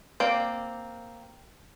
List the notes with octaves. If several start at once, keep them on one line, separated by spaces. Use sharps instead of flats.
A#3 C4 D5